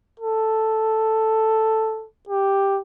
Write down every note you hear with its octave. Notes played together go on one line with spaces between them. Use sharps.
A4
G4